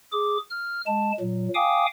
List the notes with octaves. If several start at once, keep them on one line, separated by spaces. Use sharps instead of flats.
G#4 D6
F6
G#3 A5
A#2 F#3
F5 G5 G#5 D6 D#6